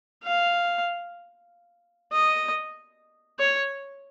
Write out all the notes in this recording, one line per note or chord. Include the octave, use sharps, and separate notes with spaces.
F5
D#5
C#5